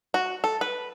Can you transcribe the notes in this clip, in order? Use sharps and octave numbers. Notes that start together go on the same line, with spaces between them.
F#4
A4
B4